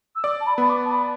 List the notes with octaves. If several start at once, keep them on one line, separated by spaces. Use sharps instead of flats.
E6
D5 D6
A5
B5
B3 B5
D6
A5
B5